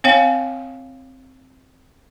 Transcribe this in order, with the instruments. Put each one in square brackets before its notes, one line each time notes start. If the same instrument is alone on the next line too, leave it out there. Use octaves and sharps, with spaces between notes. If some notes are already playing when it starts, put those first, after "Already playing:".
[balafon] C4 C#5 F5 G5